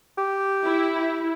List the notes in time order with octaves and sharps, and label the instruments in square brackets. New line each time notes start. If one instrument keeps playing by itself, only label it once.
[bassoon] G4
[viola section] E4